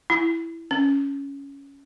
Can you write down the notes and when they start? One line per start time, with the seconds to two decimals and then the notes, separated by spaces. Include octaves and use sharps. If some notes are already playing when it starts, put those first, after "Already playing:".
0.10 E4
0.71 C#4